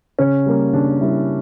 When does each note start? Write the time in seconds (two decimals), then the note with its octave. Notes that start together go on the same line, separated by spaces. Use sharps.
0.19 C#3 C#4
0.46 G3 A#3
0.73 C#3 D4
1.01 G3 A#3 E4